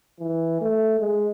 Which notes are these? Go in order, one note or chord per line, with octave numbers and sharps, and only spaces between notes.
E3
A3
G#3